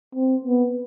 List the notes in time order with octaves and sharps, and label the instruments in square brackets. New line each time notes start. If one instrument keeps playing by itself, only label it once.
[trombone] C4
B3